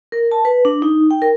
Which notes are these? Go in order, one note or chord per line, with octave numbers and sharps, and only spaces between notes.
A#4
A5
B4
D4
D#4
G5
A#4